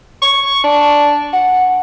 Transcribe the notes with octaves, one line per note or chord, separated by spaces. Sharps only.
C#6
D4
F#5